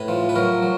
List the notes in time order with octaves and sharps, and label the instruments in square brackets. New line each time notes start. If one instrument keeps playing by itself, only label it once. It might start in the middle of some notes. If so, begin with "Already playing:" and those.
Already playing: [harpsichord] A2 B4
F3
B4
F#3 A#4
F#3